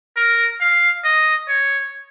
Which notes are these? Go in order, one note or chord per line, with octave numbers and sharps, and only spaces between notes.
A#4
F5
D#5
C#5